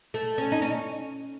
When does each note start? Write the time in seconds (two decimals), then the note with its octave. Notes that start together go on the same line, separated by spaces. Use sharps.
0.14 A3
0.38 C#4
0.52 D#4
0.62 C#4